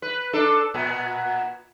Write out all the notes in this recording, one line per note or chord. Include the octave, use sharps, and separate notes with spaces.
B4
D4 A4
A#2 B3